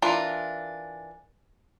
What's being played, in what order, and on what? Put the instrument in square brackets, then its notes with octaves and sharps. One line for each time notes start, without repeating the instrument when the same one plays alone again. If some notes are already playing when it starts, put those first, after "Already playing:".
[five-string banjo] E3 D4 F4 A#4